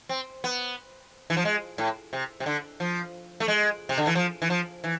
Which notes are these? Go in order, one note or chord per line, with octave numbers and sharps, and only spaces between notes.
C4
B3
E3
F3
G#3
A2
C3
C3
D3
F3
A3
G#3
C3
D3
E3
F3
E3
F3
E3